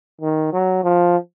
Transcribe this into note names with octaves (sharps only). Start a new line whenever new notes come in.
D#3
F#3
F3